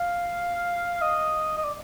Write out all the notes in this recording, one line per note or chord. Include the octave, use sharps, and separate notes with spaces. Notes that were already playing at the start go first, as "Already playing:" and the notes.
Already playing: F5
D#5
D#5
D5